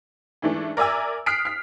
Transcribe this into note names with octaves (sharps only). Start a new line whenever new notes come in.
G#2 E3 A3 D4
A#4 D5 E5 G#5 E6
D#6 F6 F#6 B6 C7 D7
F6 B6